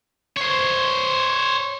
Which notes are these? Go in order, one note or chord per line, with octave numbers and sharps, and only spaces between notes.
C5 C#5